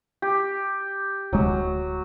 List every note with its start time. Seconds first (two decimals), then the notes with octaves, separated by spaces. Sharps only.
0.22 G4
1.33 D1 F#3 G#3